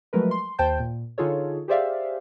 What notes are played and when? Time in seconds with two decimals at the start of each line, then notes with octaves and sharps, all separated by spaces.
0.13 F3 F#3 G#3 A3 A#4 B4
0.31 C6
0.58 D#2 C5 G5 A5 G6
0.80 A#2
1.18 D3 D#4 F4 G#4 A4 C#5
1.68 G4 G#4 C5 D5 E5 F5